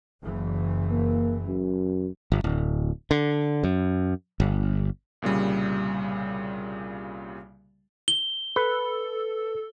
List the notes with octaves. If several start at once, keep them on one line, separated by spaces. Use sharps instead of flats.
F#1 E3
A#3
F#2
G1
D1
D3
F#2
G1
C2 A#2 C#3 G3
G7
A4 B4